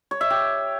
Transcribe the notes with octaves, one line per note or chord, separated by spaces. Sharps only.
C#5
E5
G4